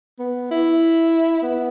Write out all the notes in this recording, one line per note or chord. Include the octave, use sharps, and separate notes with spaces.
B3
E4
B3